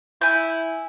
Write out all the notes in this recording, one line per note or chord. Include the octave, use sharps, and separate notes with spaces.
E4 G#5 G6